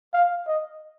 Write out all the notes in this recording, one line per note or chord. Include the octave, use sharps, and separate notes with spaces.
F5
D#5